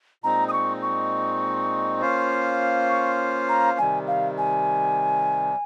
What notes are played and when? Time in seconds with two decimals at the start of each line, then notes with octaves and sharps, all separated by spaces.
0.24 A#2 G#3 C4 D#4 A#5
0.48 D#6
0.53 C#6
0.82 C#6
2.01 A#3 C#4 F4 C5 F5
2.89 C#6
3.49 A#5
3.78 C3 D#3 G3 G#5
4.07 F5
4.38 G#5